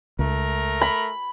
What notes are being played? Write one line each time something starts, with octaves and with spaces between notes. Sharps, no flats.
C#2 A3 A#4
B5